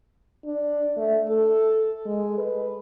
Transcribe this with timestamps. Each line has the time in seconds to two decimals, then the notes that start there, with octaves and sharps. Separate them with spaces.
0.45 D4
0.97 A3
1.29 A4
2.06 G#3
2.38 B4